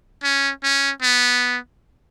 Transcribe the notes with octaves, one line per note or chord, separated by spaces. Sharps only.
C#4
C#4
B3